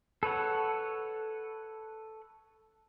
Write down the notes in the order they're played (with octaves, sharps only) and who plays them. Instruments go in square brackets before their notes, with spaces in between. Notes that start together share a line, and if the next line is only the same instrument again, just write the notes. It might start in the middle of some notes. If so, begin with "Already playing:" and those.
[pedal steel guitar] A4 B4 C#5 F#5